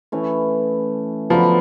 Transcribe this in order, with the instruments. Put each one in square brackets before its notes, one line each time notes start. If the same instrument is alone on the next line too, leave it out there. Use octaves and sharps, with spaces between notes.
[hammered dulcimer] E3 A3 C#4 E4
[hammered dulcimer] D3 F#3 B3 [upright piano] F3